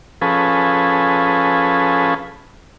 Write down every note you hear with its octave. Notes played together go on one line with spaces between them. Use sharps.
F3 C#4 G#4 A4 B4